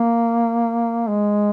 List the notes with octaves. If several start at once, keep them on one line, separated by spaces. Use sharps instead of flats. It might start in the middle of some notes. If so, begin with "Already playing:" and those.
Already playing: A#3
G#3